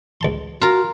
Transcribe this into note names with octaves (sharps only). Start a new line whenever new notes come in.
C#2 A5 C6
F4 F#4 A#4